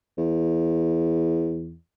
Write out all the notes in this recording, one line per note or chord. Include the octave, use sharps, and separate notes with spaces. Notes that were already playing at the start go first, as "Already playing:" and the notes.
E2